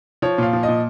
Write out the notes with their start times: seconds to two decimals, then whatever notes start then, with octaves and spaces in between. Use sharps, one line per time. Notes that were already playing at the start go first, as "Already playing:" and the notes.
0.22 F3 C#5
0.38 A#2 F5
0.53 F3
0.63 D#5
0.68 A#2